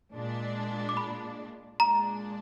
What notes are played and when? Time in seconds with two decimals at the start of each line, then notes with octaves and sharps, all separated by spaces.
0.14 A#2 G#3 D4
0.89 D6
0.97 B5
1.79 A#2 G#3 D4 A#5